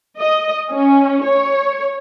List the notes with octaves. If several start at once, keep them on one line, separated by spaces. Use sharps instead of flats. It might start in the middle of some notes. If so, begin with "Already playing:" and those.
D#5
C#4
C#5